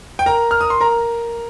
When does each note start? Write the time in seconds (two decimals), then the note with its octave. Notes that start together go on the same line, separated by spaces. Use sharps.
0.19 G5
0.26 A#4 A#5
0.51 F6
0.61 D#6
0.70 C6
0.81 A#4 A#5